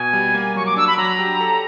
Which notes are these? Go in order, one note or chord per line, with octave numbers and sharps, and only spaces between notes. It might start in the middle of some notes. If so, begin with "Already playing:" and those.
Already playing: B2 G#5
G3
A#3
F#3 C#6
D6
D4 E6
B5
F#3 A#5
G4
A4